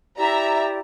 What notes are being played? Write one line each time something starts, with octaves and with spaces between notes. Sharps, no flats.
E4 G4 D5 E5 A#5